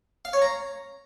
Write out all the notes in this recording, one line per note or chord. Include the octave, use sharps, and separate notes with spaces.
F5
C#5
A#5